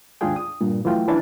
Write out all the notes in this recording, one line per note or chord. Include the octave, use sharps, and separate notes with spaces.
D#2 G#2 D4 F4 G#4 G5
D#6
G2 A#2
E3 F#3 A3 F4 G5
E3 C#4 D4 E5 A6